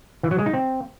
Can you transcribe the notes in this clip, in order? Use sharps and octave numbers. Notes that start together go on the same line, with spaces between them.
E3
F#3
G#3
D#4
C4